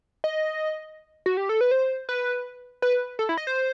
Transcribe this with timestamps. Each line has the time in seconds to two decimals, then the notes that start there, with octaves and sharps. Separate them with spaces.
0.24 D#5
1.26 F#4
1.37 G4
1.49 A4
1.61 B4
1.71 C5
2.09 B4
2.82 B4
3.19 A4
3.29 E4
3.37 D#5
3.47 C5